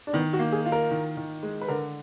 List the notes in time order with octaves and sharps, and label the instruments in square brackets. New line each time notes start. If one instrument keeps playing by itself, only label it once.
[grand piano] D4
[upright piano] D#3 [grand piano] B3
[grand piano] F#4
[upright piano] A#3
[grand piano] G#4
[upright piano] F4
[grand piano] A#4
[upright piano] D#3
D#3
G#3
[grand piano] B4
[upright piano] D3 [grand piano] A#4